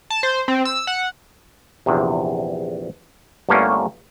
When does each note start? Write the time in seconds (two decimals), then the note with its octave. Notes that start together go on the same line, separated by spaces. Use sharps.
0.10 A5
0.23 C5
0.48 C4
0.65 E6
0.87 F#5
1.86 A#1 E2 C3
3.49 G1 G2 D3 A3 A#3 C#4